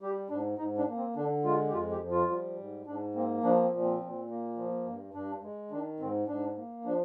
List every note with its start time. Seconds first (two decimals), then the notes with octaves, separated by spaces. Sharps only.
0.01 G3 G4
0.30 G#2 D4
0.58 G#2 D#4
0.78 D4
0.88 A#3
0.97 C4
1.16 D3 D4
1.44 G#3 F4
1.69 G4
1.73 F2 F4
1.92 G4
2.01 F3
2.11 F4
2.29 G3
2.58 G#2
2.86 G#2 D4
3.15 A#3 C4
3.44 F3 D4
3.62 C4
3.72 A#2
3.82 C4
4.00 A#2
4.29 A#3
4.57 F3
4.86 G2
5.14 G2 D4
5.43 G#3
5.71 D#3 D4
6.00 G#2 C4
6.28 G#2 D4
6.56 A#3
6.85 F3 D4